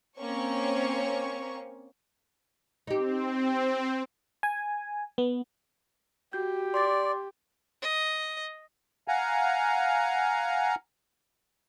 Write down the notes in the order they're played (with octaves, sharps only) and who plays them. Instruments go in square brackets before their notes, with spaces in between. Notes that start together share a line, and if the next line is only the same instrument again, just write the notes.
[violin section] A#3 C4 C#4 C#5 C#6
[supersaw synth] C4 [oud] D#4 G4
[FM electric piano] G#5
B3
[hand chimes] F#4 G6 [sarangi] G4
[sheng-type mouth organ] D5 [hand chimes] C6 D6 A6
[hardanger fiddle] D#5
[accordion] F5 F#5 G#5 A#5